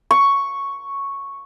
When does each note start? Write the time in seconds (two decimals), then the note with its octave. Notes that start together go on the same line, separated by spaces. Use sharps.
0.11 C#6